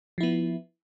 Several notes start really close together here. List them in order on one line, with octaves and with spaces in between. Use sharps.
F3 E4 B3